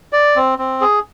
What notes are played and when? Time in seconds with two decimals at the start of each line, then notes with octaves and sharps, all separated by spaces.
0.13 D5
0.36 C4
0.58 C4
0.81 G#4